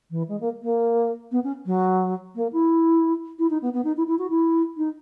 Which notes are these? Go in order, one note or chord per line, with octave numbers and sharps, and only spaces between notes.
E3
G#3
A#3
A#3
B3
C#4
F#3
A#3
E4
E4
D#4
B3
B3
D#4
E4
E4
F#4
E4
D#4